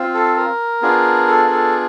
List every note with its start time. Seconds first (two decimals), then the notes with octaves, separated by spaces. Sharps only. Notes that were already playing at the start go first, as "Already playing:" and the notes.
Already playing: C4 F4
0.14 A4
0.37 A#4
0.82 B3 D4 F4 G#4
1.27 A4
1.46 A#4
1.51 A4